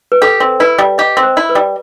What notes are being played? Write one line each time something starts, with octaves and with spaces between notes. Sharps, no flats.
B4
G4 A4
C4
E4 B4
G3
G4 D#5
C4
C5
E4
B4
G3